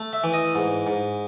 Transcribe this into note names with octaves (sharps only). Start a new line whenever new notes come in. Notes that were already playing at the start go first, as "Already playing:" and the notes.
Already playing: A3
E5
E3
D#5
G#2
G#2